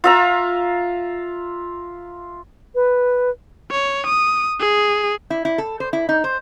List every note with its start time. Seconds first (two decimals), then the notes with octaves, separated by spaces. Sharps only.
0.04 F4 E5 A#5
2.75 B4
3.71 C#5
4.06 D#6
4.60 G#4
5.30 E4
5.45 E4
5.58 A4
5.80 C5
5.93 E4
6.09 D#4
6.24 C5